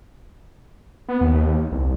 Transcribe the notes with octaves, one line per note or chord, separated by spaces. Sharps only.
B3
D#2
C2